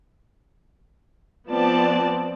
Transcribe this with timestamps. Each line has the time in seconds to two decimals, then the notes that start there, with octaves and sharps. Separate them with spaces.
1.48 F3 B3 C4 D5 A5